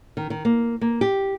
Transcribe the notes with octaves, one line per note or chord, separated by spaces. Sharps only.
D#3
D#3
A#3
A#3
G4